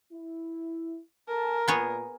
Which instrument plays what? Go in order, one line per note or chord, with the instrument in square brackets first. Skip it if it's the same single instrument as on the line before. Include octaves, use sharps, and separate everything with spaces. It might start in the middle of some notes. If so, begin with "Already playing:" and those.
[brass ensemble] E4
[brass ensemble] A4 G#5 A5 [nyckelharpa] A#4
[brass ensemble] A#2 [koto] B3 G#4 C#5